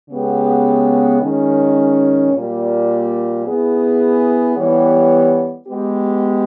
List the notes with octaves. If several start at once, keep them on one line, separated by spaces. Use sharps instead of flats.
C#3 G#3 B3 G4
D#3 G#3 C#4
A#2 G3 A#3
B3 E4 G#4
E3 G3 B3 G4 C#5
G#3 B3 G4